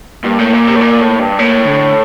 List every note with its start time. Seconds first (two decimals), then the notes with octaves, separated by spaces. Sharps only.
0.24 G2 A#3
0.39 A2
0.53 A#2
0.67 C3
0.76 A2
0.81 A#2
1.01 A2
1.19 G2
1.39 A2 A#3
1.67 D3